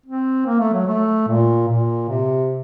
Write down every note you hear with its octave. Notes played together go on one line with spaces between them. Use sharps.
C4
A#3
A3
F#3
A3
A#2
A#2
C3